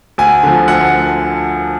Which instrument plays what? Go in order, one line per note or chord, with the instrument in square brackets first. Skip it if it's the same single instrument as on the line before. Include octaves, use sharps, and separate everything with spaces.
[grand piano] D2 G#5
D3 F3
D2 F#5